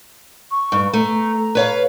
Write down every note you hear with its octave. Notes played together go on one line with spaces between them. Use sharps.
C#6
G2
A3 A#5
B4 C#5 F5